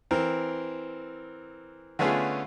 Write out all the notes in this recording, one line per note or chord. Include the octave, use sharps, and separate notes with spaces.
E3 C4 A#4
D3 A3 B3 C#4 F4 G#4